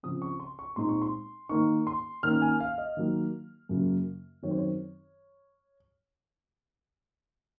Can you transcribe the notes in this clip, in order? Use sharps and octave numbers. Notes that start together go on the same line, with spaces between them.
C#3 F3 C4 D#6
C#6
C6
C#6
A#2 G#3 C4 D#4 C6
C#6
C6
D#3 A#3 D#4 C#6
C6
D#3 A#3 C#4 F6
G#5
F5
D#5
D#3 F#3 A#3
F#2 C#3 F#3 A#3
F#2 D#3 F#3 C4 C#5
C5
C#5